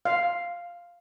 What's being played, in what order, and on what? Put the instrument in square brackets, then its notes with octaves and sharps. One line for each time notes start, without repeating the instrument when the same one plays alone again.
[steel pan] F5